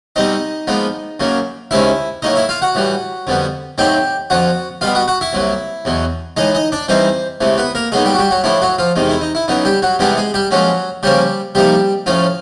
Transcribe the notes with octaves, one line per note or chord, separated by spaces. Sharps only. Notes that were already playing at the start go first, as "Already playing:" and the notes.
B2 G3 C4 D#4 D#5
A#2 F3 G#3 B3
F#2 C#3 F#3 A#3
C#2 C3 D#3 G#3 C#4 E4 E5
A2 F#3 A#3 D#4 D#5
E4 E5
F4 F5
F#4 F#5
A2 E3 G3
F2 D3 G3 B3
A2 F#3 A3 C4 D#4 G4 G5
F2 D3 F3 F#4 F#5
B2 G3 B3 F4 F5
F#4 F#5
F#4 F#5
E4 E5
C2 A#2 F#3
E2 B2 F#3
A2 E3 G#3 D#4 D#5
D#4 D#5
D4 D5
G2 E3 G3 C4 D#4 C5
C#2 C3 E3 A3
B3 B4
A#3 A#4
A#2 F#3 G#3 B3 D#4 G#4
G3 G4
F#4
G3 G4
F#3 F#4
A2 F3 A3 D4 E4
F#3 F#4
F3 F4
E2 C3 D#3 G#3
E4
D#4
E4
C#3 F#3 B3 D#4
G3 G4
F#3 F#4
C3 E3 G3 G#3 B3 D4 G4
G#3 G#4
G3 G4
A#2 F3 F#3 G#3 C#4 F#4
C#3 F3 G3 A#3 C#4 G4
C3 F3 G3 A#3 D#4 G4
A2 F3 A3 C#4 F4